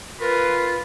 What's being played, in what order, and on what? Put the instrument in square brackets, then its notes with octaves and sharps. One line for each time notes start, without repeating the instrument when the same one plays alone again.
[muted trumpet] F4 [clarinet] A#4 [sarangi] B4